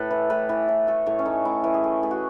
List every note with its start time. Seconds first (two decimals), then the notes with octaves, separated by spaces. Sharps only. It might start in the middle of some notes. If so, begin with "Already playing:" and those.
Already playing: A2 A4 B4
0.11 E3
0.30 A2 B4
0.49 E3
0.68 A2
0.87 A3 A4
1.06 A2 C#5
1.19 C#4
1.25 A2 D#4
1.45 A2 E4
1.64 E3
1.74 G#4
1.84 A3
2.03 A3 G#4
2.11 F#4